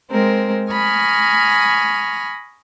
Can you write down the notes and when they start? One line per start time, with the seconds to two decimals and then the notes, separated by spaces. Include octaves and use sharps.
0.10 G#3 C4 A#4
0.71 G#5 A#5 B5 C#6 D#6 F6